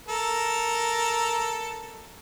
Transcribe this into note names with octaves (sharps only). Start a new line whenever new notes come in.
A4 A#4